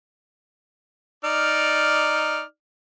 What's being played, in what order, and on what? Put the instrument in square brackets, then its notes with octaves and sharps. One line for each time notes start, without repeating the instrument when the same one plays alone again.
[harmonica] D#4 D5 F6